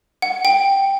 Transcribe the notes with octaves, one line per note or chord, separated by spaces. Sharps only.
F#5
G5